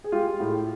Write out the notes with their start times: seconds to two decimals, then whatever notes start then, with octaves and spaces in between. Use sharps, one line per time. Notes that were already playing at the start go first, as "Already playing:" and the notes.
0.04 G#4
0.12 G#3 F4 G4
0.40 A2